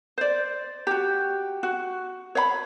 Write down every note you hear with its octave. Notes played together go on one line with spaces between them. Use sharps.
C5 D5
F#4 G4
F#4
C#5 F5 B5